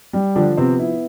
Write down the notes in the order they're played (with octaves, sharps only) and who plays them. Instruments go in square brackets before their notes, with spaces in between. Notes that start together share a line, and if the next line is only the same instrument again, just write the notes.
[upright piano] G3
[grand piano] D3 D4 [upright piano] F3
[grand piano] C3 C4 [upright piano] B3
[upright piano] E4